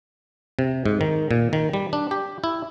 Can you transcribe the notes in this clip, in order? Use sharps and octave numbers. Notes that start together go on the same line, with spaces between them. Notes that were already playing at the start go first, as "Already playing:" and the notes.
C3
G#2
D#3
A#2
D#3
G3
D4
G4
E4